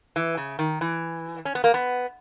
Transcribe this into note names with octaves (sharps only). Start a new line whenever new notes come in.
E3
C#3
D#3
E3
C#4
B3
A#3
B3